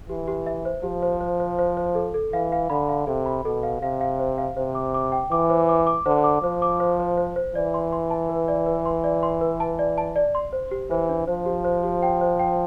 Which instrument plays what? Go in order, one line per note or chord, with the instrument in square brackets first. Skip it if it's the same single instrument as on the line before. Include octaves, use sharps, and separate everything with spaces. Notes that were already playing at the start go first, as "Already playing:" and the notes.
[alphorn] E3 [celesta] G4
[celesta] G4
E5
C5
[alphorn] F3 [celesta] G4
[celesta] C5
C5
C5
C5
C5
A4
A4
[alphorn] E3 [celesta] F5
[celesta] F5
[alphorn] D3 [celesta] B5
[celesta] F5
[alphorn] C3 [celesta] A4
[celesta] B5
[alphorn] B2 [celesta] A4
[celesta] F5
[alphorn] C3 [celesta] F5
[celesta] F5
C5
F5
[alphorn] C3 [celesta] C5
[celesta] D6
D6
G5
[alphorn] E3 [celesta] D6
[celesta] C5
D6
D6
[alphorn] D3 [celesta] C5
[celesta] D6
[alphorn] F3 [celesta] C5
[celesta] D6
C5
C5
C5
C5
[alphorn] E3 [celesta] D5
[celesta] C6
C6
A5
B4
D5
B4
C6
D5
C6
B4
A5
D5
A5
D5
C6
C5
G4
[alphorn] E3 [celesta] C5
[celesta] D4
[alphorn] F3 [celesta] C5
[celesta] G4
C5
G4
G5
C5
G5